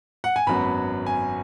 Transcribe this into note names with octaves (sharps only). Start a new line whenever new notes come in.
F#5
G#5
G#1 F#2 F#3 B3 B5
G#5